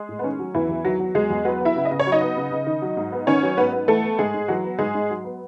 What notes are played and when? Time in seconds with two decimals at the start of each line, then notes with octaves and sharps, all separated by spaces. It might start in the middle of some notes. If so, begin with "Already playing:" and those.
Already playing: G#3 G#4
0.09 A2
0.19 B3
0.24 D#3 C#4
0.39 F#3
0.55 E2 E3 E4
0.69 E2
0.84 D#3 F#3 F#4
1.00 F#3
1.15 E2 G#3 G#4
1.30 E2
1.45 F#3 B3 B4
1.61 B3 E4 E5
1.76 C#3
1.85 D#5
1.91 C#3
1.99 C#5
2.06 F#3
2.12 D#4 D#5
2.21 B3
2.37 C#3
2.51 C#3
2.66 D#3
2.82 F#3
2.97 G#2
3.12 B3
3.27 D#3 C#4 C#5
3.42 F#3
3.57 G#2 B3 B4
3.73 B3
3.88 E3 A3 A4
4.03 B3
4.19 G#2 G#3 G#4
4.34 G#2
4.48 E3 F#3 F#4
4.64 B3
4.79 G#2 G#3 G#4
4.95 G#2
5.10 F#3
5.24 B3